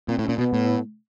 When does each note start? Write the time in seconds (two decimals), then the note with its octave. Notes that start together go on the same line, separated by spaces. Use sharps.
0.08 A#2 C4
0.18 A2
0.23 C#4
0.28 A#2
0.38 B2 B3
0.53 A2